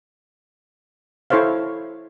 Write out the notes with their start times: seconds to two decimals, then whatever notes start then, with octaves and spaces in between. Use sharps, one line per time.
1.30 E4 A4 C5 C#5 F5